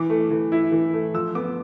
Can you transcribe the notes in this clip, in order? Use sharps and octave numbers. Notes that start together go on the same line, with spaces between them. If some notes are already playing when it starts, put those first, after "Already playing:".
Already playing: E3 D6
A3
E3
E4
E3
A3
F3 E6
B3 D6